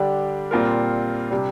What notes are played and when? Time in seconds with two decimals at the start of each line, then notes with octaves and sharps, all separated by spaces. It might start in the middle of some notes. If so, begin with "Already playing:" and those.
Already playing: D3 G3 D4 G4
0.51 A#2 G3 C4 F4 A#4
1.31 C3 G3 D4